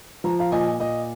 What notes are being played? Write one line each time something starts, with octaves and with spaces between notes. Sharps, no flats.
F3 A#5
F5 A#5
A#2 D#5 G#5
A#2 D#5